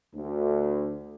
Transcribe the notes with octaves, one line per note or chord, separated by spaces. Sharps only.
D2